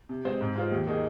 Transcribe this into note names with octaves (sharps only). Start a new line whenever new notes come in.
C3
G#3 C4 G#4 C5
G#2
G#3 F4 C5
D#2
D#3 A#3 D#4 G#4